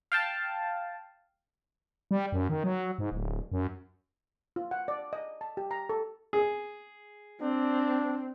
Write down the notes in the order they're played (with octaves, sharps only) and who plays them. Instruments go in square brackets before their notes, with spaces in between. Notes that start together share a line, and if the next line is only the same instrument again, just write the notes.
[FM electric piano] F5 G5 A5
[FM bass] G3
F#2
D#3
F#3
G#2
D1
F#2
[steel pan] F4
F#5
D5
D#5
A5
G4
A#5
A4
[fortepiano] G#4
[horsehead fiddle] C4 [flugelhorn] D4